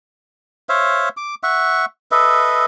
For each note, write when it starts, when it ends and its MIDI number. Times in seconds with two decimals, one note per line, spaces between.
0.69 1.09 72
0.69 1.09 73
0.69 1.09 76
0.69 1.09 77
1.17 1.35 86
1.43 1.86 76
1.43 1.86 78
1.43 1.86 85
2.12 2.66 69
2.12 2.66 71
2.12 2.66 75
2.12 2.66 76